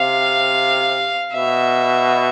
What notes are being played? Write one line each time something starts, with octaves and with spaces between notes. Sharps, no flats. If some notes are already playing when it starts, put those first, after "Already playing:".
Already playing: C3 F5
B2 E5